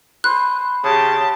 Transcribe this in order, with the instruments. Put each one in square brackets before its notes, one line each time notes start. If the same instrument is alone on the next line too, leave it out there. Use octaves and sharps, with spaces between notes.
[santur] B4 C5 [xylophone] F#6
[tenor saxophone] C#3 [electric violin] G4 A5